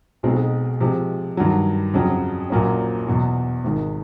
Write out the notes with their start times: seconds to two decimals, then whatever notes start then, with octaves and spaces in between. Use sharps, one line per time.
0.23 B1 B2 G#3 C4 D#4
0.80 C3 F3 G#3
1.37 G2 D#3 F#3
1.94 F2 C#3 F#3
2.50 A#1 A#2 F#3 A#3 C#4
3.07 E2 B2 F#3
3.64 G#1 G#2 D#3